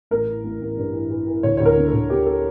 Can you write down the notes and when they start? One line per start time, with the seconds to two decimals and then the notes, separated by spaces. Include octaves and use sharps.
0.11 A1 A#4
0.27 E3
0.44 A1
0.61 A1
0.77 G2
0.93 E3
1.10 E3
1.27 E3
1.43 D2 C#5
1.57 D2 C#5
1.65 A#4
1.76 D3
1.88 A4
1.93 D2
2.10 D3 G4
2.26 A4